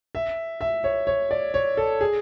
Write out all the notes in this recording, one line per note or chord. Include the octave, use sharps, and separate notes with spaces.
E5
E5
C#5
C#5
D5
C#5
A4
G#4